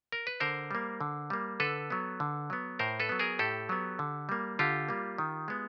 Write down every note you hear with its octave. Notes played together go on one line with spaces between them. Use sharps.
A#4
B4
D3 A#4 C5
G3 A#3
D3
G3 A#3
D3 A4 B4
F#3 B3
D3
F#3 B3
A2 A#4 C5
A4 B4
F#3 B3
G#4 A#4
A2 G4 A4
F#3 B3
D3
G3 A#3
D3 F4 G4
G3 A#3
D#3
G#3 B3